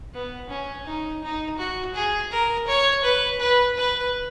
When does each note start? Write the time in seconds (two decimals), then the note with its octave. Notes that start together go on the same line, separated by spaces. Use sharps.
0.14 B3
0.50 C#4
0.87 D#4
1.23 D#4
1.58 F#4
1.95 G#4
2.32 A#4
2.68 C#5
3.04 B4
3.40 B4
3.77 B4